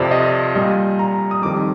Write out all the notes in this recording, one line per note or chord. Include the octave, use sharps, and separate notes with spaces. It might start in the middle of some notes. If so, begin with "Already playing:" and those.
Already playing: F2 C3 F3 D5
D#5
A#2 G3 D#5
A#5
D#6
F2 D#3 G3 D6